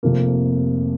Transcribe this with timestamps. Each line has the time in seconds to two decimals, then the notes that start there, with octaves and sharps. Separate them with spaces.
0.03 F1 F2 C3 F3 A#3